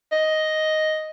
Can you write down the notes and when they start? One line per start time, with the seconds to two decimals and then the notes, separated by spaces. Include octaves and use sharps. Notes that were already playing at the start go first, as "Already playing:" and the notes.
0.12 D#5